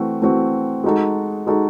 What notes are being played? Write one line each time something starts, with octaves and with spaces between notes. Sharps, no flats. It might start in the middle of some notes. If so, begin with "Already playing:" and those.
Already playing: E3 A3 C4 F#4
E3 A3 C4 F#4
G#3 D#4 F#4 A4
G#3 D#4 F#4 A4